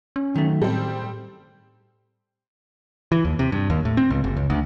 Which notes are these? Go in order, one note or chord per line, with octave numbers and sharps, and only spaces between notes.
C#4
D#3 F#3 A3
A2 G3 C4 A4
E3
D#2
C3
G2
D#2
A2
C4
C#2
F#1
C#2
D2